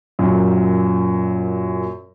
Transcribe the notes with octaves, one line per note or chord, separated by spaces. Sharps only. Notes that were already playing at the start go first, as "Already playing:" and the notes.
F#2 A#2